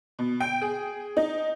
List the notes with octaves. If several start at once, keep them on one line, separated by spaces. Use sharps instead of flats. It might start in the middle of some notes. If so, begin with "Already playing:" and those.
B2
G5
G#4
D#4